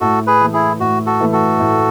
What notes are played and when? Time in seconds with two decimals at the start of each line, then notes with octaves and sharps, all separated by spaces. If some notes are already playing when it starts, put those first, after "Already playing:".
0.01 A2 F#4 A4
0.27 G#4 B4
0.41 E3 A3
0.53 E4 G#4
0.80 A2 F#4
1.06 F#4 A4
1.20 E3 A3
1.33 F#4 A4
1.59 A2